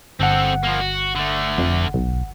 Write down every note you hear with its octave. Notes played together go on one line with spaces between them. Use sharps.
G1 C4 A4 F#5
F3 A#3
F#4
D3 A3
F2
B1